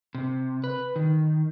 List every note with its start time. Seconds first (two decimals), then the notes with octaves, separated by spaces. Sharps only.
0.15 C3
0.64 B4
0.96 D#3